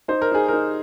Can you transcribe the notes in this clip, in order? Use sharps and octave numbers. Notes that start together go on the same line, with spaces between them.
D#4 C5
A#4
D#4 G#4
A#4
D#4